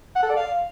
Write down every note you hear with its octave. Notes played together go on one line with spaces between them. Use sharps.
F#5
A4
D5
F5